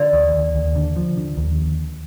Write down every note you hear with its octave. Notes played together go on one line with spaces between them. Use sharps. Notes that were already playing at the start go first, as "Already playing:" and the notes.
Already playing: D3 D5
D#2
D#2
D#2
D3
F3
D3
D#2